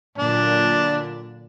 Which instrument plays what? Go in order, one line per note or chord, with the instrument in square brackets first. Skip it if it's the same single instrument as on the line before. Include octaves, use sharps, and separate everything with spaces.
[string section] A#2 D3 F#3 [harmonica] D4